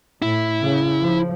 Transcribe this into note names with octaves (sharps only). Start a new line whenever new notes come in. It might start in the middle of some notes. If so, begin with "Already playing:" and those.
A2 E4
C#3
F3